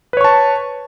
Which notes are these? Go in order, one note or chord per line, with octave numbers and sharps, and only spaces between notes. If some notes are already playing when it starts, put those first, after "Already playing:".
B4 C#5 A5 C#6